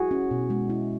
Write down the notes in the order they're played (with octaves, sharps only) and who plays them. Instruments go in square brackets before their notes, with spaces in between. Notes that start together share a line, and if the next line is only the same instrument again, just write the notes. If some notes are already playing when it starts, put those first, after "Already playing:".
Already playing: [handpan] E4 F#4 G#4
C#4
B2
G#3
E4